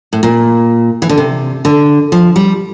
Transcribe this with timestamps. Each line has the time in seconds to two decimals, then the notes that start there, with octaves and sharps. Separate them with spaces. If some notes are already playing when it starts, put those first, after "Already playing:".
0.13 A2
0.23 A#2
1.02 E3
1.09 D3
1.18 C3
1.65 D3
2.12 F3
2.36 G3